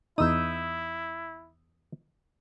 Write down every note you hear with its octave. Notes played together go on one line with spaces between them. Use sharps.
E2 D#4 E4 D#6 E6 G6